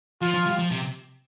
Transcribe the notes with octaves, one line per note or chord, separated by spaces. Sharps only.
F3 F4
F3
G3
F3
C3